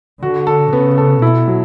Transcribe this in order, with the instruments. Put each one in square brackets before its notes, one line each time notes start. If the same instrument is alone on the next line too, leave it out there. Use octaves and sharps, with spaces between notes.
[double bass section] D3 [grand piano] F#4
[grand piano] A4
[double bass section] C#3 [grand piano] B3
[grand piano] A4
[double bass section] B2 [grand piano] E4
[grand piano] F#3